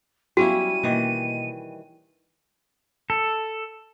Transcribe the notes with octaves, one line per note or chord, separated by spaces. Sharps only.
F#3 G3 B3 C#4 E4 F#4 F5 D#7
B2 D#3 E3 A#3 D#5
A4